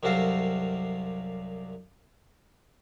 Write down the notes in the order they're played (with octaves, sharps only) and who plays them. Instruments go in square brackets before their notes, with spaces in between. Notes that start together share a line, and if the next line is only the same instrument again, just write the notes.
[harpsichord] C2 F#2 C3 F#4 A4 F5